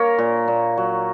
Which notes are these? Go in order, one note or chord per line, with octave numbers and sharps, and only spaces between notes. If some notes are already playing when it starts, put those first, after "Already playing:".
Already playing: A#3 A#4 C#5
A#2
A#2
F#3